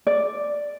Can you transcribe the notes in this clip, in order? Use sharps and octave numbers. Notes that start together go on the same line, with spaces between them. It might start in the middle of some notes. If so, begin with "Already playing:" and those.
D5